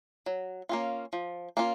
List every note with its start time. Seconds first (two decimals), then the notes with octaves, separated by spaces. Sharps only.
0.26 F#3
0.69 A#3 C#4 F4
1.13 F3
1.57 A#3 C#4 F4